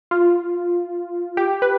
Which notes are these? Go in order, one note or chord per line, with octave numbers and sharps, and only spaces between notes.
F4
G4
B4